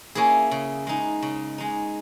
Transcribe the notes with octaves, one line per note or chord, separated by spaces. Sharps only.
A#3 C#4 E4 G#4
C#3
G#3 D#4
C#3
G#3 D#4